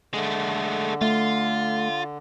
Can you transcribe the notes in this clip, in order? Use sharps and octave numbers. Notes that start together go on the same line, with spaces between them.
D3 G#3 A3
A3 F4